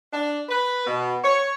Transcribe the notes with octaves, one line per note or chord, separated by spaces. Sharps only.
D4
B4
B2
C#5